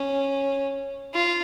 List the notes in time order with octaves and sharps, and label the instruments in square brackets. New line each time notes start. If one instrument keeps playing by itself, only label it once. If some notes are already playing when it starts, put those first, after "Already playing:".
Already playing: [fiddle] C#4
F4